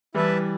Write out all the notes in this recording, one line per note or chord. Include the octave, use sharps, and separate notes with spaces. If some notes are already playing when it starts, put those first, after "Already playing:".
E3 G3 E4 B4 E5 A5